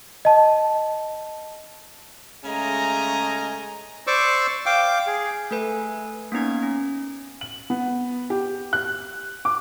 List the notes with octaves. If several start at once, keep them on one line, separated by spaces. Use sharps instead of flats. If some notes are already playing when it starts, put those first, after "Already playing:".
D#5 A5
C#3 G#3 A3 D#5 G#5 A#5
C5 D5 C#6 D6 E6
F5 G5 D6
G#4
A3 A4 B4 G#5
A#3 B3 C#4 D#4 G#6
C#4
F#7
B3
G4
F#6
D6